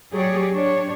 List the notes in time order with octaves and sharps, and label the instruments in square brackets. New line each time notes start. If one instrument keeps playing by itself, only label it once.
[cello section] F#3 G4 G#4 C#5 D5
D4 G4 C#5